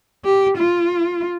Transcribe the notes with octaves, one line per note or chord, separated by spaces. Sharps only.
G4
F4